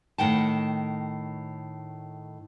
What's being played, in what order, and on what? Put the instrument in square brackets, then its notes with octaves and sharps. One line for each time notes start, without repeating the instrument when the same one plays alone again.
[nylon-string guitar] A2 D#3 F#5 G5 A5